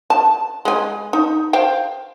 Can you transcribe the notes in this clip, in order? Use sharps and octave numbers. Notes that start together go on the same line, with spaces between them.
A5
G#3 G#5
D#4
C5 F5 G5